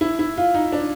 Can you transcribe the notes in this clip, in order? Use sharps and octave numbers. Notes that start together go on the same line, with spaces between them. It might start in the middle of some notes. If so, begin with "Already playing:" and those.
E4
E4
F4
D#4
D4